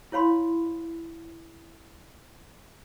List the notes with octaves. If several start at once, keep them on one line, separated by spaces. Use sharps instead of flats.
E4 C#5 F5 B5 C6